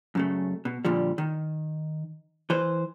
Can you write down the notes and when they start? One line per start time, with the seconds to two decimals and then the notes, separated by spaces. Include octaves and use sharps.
0.15 F#2 C#3 A3
0.65 B2
0.85 A#2 D3 F3 G3
1.18 D#3
2.50 E3 B4 C5